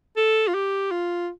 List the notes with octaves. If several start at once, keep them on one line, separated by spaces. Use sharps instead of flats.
A4
F4
G4
F4